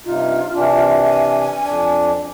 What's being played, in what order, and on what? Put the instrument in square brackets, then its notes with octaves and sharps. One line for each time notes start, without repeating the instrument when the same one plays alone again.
[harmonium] G2 C3 D#4 [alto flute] F4
[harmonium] C3 E3 D4
[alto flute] G#5
[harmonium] F2 D4